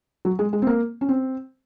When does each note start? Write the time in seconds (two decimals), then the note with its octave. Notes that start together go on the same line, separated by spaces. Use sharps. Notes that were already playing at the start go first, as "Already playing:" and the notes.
0.25 F#3
0.39 G#3
0.53 G#3
0.62 C4
0.67 A#3
1.01 C#4
1.09 C4